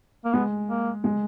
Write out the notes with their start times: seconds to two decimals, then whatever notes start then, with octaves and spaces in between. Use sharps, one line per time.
0.25 A#3
0.33 G#3 B3
0.69 A#3
1.04 G#3